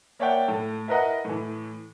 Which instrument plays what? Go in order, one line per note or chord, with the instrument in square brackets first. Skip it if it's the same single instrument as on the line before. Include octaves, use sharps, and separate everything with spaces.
[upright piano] A#3 C#5 D5 E5 F#5 G5
A2
E4 A#4 B4 D#5 F#5
A2 E3